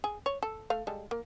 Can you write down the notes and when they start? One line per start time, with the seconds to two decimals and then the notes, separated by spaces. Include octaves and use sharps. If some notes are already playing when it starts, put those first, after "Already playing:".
0.04 G#4
0.26 C#5
0.43 A4
0.70 A3 F5
0.87 G3 G#3 A4
1.11 A#3